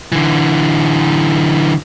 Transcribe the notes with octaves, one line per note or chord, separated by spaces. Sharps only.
D3 E3